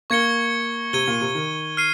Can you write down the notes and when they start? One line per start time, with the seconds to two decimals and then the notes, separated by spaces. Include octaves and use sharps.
0.10 A#3 C#6 G#6 C#7 G7
0.93 C3 G#6 D#7 G7
1.08 A#2
1.21 C3
1.35 D#3
1.77 F6 C7 D#7